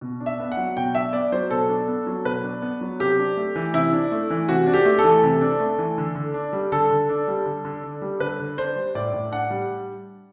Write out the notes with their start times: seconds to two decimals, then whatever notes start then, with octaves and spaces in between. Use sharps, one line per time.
0.01 B2
0.20 D4
0.26 E5
0.40 B3
0.52 F#5
0.57 F#3
0.77 B2 G5
0.95 D4 E5
1.13 B3 D5
1.32 F#3 C5
1.50 B2 A4
1.69 D4
1.88 B3
2.06 F#3
2.25 B2 B4
2.43 D4
2.62 B3
2.81 F#3
2.99 C3 G4
3.19 D4
3.37 A3
3.56 E3
3.73 C3 E4
3.93 D4
4.11 A3
4.30 E3
4.48 C3 F#4
4.67 D4
4.74 G4
4.85 A3
4.99 A4
5.04 E3
5.23 C3
5.41 D4
5.60 A3
5.78 E3
5.98 D3
6.15 D3
6.34 D4
6.53 G3
6.72 D3 A4
6.91 D3
7.09 D4
7.28 G3
7.46 D3
7.65 D3
7.83 D4
8.02 G3
8.20 D3 B4
8.40 D3
8.58 D4 C5
8.76 G3
8.95 A2 D5
9.13 A2
9.32 D4 F#5
9.50 G3